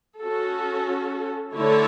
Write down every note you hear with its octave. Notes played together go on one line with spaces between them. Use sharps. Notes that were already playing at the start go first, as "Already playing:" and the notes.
C#4 F#4 A4
D3 A3 E4 A4 C#5